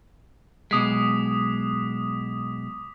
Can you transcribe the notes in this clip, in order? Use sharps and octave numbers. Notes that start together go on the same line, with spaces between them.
B1 B2 G#3 D6 D#6 B6